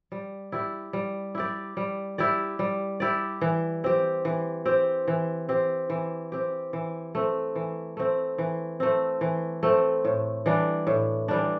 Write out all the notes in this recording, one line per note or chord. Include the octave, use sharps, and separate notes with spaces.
G3
E4 G4 D5
G3
E4 G4 D5
G3
E4 G4 D5
G3
E4 G4 D5
E3
C4 G4
E3
C4 G4
E3
C4 G4
E3
C4 G4
E3
A3 C4
E3
A3 C4
E3
A3 C4
E3
A3 C4
A2
E3 G3 D4
A2
E3 G3 D4